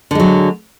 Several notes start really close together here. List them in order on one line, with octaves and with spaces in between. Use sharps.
D3 G#3 F#3